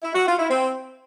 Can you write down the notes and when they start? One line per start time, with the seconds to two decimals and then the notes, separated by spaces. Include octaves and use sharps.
0.03 E4
0.15 F#4
0.27 F4
0.38 E4
0.50 C4